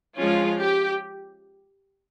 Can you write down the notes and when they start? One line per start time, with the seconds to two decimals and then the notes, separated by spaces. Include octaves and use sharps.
0.18 F3 G#3 C#4 F4
0.59 G4